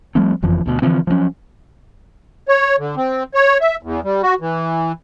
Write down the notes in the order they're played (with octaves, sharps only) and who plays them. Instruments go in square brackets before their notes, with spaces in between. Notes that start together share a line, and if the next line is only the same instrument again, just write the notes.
[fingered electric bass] F3 G3 A3 C4
F#1 F2 E3 F3
D2 B2
D3 E3 F3 C4
F3 F#3 A#3 C#4
[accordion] C#5
D3
C4
C#5
E5
E2
G3
F#4
E3